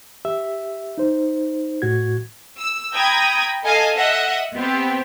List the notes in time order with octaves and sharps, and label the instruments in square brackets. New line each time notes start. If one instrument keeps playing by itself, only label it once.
[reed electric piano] G4 E5
D#4 C5
A2 F#4 G#6
[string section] E6
G5 A#5 B5 D#6 G#6
A4 D#5 F5 G#5 A5
D#5 E5 F#5
B3 C4 G4